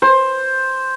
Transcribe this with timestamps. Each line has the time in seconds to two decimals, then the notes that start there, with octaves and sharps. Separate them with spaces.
0.02 C5